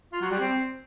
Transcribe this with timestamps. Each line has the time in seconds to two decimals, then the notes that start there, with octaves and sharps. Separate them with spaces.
0.13 F4
0.22 F#3
0.31 G3
0.40 C4